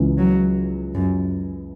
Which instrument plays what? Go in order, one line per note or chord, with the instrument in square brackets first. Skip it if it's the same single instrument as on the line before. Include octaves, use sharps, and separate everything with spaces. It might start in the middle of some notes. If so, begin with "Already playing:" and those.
Already playing: [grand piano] C#2 C#3 E3
[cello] F#3
F#2